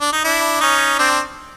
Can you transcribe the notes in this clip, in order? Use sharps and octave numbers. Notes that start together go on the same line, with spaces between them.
D4
D#4
D4 E4
C#4 D#4
C4 D4